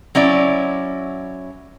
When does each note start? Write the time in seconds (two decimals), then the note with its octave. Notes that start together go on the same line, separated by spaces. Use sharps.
0.15 F#3 C#4 E4 D5